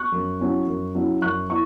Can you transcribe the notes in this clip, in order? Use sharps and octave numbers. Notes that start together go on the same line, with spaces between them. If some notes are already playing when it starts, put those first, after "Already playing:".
Already playing: C#6 F#6
F#2
F#3 C#4 E4
F#2
F#3 C#4 E4
F#2 C#6 F#6
E4 C#6